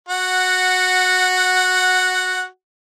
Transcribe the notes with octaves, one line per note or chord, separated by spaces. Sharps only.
F#4 F#5